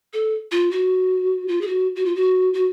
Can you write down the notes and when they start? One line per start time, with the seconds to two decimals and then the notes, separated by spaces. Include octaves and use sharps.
0.13 A4
0.51 F4
0.71 F#4
1.48 F4
1.61 G#4
1.67 F#4
1.96 F#4
2.05 F4
2.15 F#4
2.54 F#4